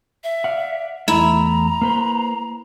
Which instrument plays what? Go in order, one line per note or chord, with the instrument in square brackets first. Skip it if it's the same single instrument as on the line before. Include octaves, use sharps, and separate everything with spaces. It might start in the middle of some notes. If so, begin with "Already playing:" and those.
[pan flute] E5
[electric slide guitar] D5 F5 F#5
[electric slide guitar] E2 A3 [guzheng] E4 [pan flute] A#5
[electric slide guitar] A#3 B4 C5